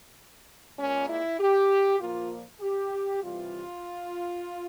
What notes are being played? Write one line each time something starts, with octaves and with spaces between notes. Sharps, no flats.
A#2 G#3 C#4
E4
G4
A#2 F3 A#3 F4
G4
C3 E3 G3 F4